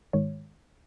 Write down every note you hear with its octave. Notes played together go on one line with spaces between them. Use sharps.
G#2 D#3 G#3 C#5